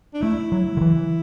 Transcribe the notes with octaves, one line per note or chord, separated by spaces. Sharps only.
D4
A3 E4
F#3
D3
E3